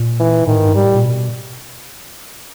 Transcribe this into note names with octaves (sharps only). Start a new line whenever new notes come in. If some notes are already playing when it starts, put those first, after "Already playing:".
Already playing: A#2
E3
A2 D#3
G#2
G2
G#2 G3
A2
A#2
B2